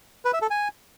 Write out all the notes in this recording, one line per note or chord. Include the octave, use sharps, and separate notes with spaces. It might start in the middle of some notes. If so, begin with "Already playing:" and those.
B4
E5
A4
G#5